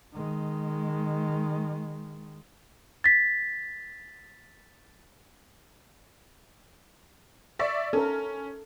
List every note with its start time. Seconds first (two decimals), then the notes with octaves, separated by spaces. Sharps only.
0.13 D#3 G#3
3.04 A6 B6
7.59 D5 E5 C#6
7.93 C#4 A4 A#4